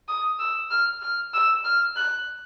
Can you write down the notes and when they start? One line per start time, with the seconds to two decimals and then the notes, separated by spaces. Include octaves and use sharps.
0.08 D#6
0.39 E6
0.70 F6
1.02 F6
1.34 E6
1.64 F6
1.96 F#6